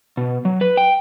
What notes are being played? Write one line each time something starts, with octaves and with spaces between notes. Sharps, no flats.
B2
F#3
B4
G5